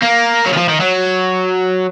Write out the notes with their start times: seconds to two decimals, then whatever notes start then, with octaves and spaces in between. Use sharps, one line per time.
0.02 A#3
0.46 F#3
0.53 D#3
0.57 F3
0.69 D#3
0.80 F#3